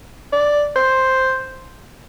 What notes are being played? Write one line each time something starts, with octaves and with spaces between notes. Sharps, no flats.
D5
C5